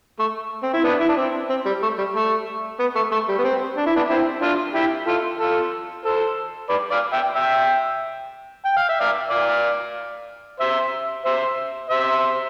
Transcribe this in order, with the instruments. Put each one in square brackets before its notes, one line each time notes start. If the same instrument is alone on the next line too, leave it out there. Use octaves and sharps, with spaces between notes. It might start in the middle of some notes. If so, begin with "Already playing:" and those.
[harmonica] A3
C4
E4
B3 D4
E4
D4
C4
C4
G3
A3
G3
A3
B3
A3
A3
G3
B3
C4
D4
E4
B3 D4
C4 E4
D4 F4
E4 G4
F4 A4
F4 A4
A4 C5
B4 D5
D5 F5
E5 G5
E5 G5
G5
F5
E5
D5 F5
D5 F5
C5 E5
C5 E5
C5 E5